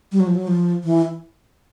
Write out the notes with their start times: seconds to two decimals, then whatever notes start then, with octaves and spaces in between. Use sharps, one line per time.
0.12 G3
0.20 F#3
0.27 F3
0.35 F#3
0.48 F3
0.84 E3